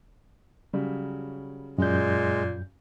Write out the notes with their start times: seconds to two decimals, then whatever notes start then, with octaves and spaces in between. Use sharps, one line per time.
0.73 C#3 F#3 G3
1.78 F#2 A#2 G#3 G6